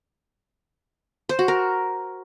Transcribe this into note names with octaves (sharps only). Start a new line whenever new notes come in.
C5
F#4
A#4